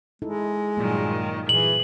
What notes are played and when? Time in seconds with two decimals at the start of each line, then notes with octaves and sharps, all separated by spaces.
0.22 G#3 D#4 E4 A4
0.77 G2 A#2 D#3 F#3 G3 A#3
1.49 A#2 E3 G#4 F#7